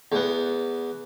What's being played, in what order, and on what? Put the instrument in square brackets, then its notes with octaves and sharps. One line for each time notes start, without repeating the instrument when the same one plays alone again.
[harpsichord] E2 B3